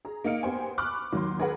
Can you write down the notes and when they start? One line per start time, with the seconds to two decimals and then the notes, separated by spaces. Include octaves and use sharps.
0.05 G#4 A#5
0.24 A#3 D#4 F5 C#7 D7
0.43 B3 G4 C5 G#5
0.78 B5 C#6 D6 F6 F#6
1.13 D#2 F#3 C6
1.39 G#4 A#4 B4 F#5